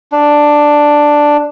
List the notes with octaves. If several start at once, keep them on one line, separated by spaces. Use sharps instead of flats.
D4